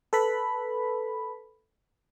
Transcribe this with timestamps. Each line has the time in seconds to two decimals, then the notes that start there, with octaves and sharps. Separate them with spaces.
0.13 A4 B4 B5